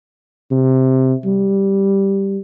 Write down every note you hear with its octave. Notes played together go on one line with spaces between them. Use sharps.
C3
G3